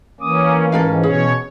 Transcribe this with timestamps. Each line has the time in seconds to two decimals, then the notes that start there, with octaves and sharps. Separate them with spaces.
0.20 E3 A#3 C#4 D6 D#6
0.72 G#2 C#4 A4 A#4 F5
1.03 B2 G#4 C#5